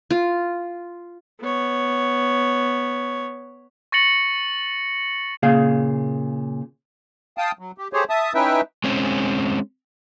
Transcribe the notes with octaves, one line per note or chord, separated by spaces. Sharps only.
F4
B3 C#5
C#6 A6 A#6 C#7 F#7
A#2 C#3 G#4 F5
F5 G5 A5 D#6
F#3
G4
A3 G4 G#4 C5 C#5
E5 A5 D#6
C#4 D#4 E4 B4 E5 G5
G#3 C4 C#4